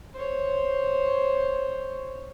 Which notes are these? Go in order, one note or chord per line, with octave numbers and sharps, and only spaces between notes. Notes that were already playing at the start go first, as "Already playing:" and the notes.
C5 C#5